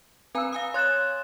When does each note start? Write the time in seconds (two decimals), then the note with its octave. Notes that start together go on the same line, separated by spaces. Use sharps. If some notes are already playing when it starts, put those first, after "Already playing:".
0.35 C4 B4 G#5 A#5 E6
0.53 F5 G#5 D#6
0.74 C#5 C6 F#6 A6 E7